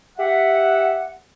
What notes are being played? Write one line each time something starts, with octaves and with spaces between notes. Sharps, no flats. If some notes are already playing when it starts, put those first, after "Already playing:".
G4 E5 F#5